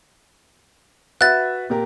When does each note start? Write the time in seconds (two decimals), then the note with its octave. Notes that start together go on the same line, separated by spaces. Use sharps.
1.21 F#4 B4 E5 F#6 A6
1.70 A#2 G4 A#4